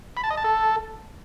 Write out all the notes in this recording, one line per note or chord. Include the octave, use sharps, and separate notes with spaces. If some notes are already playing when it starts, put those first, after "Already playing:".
B5
A5
D#5
A5
A4